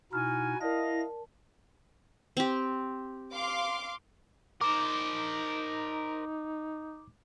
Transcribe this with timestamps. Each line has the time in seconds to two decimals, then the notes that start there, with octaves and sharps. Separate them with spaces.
0.13 B2 D#4 E4 F#4 G#5 F6
0.60 E4 A#4 D5 D#5 F5 A5 A#6
2.37 C4 G4
3.33 F5 C6 D6
4.61 D#4 A#4 C5 D6